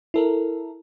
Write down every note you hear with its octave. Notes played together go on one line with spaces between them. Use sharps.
E4 A4 A#4